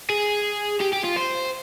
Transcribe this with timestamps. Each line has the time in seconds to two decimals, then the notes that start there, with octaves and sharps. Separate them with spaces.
0.10 G#4
0.81 G4
0.93 G4
1.05 F4
1.17 C5